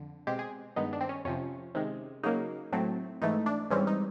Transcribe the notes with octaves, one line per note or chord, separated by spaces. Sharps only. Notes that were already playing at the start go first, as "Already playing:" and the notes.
Already playing: F2 D3
B2 G#3 C4 G4
G#4
G2 D#3 G#3 B3 D#4
D4
C4
C#4
F2 C3 F3 C#4
C3 D#3 G#3
C#3 F#3 A#3 D#4
A2 F#3 A3 C4
G#2 E3 A3 D#4
D4
G#2 E3 G3 C4 C#4
D#4